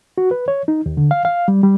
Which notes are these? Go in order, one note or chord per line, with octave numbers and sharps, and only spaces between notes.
F#4
B4
C#5
D#4
D#2
D3
F5
F5
G3
G3